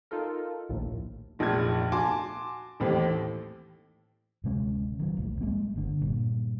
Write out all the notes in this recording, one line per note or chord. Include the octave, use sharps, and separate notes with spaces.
D#4 F4 A4 A#4
A#1 D#2 A2
F1 A#1 A#2 A3 G#6
F#4 G#5 A5 C6 D6
A1 D#2 A2 C4 G4 A4
D1 C3 G#3 C#4
D#3 F#3
D#1 B1 A2
G3 G#3 A#3 C4
G1 D3
G2 A#2